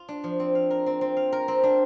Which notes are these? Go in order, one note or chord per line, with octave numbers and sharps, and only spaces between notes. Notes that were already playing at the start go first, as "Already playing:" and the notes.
Already playing: F4
D4
F3
C4
F5
A#4
C4
C4
F5
A#4
C4
D4